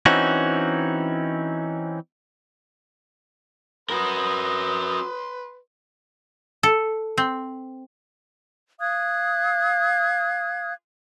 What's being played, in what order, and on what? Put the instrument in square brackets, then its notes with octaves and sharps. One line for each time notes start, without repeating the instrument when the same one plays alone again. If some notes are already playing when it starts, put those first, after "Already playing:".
[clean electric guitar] E3 C4 C#4 D#4 F#4
[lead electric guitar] F#4 A#4 [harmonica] B4 C6 [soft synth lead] D#6
[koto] A4
C4
[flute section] F5 D#6 F#6 G#6